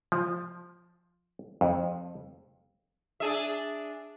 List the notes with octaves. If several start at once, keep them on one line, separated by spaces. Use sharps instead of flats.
F3
F2
D4 G#4 E5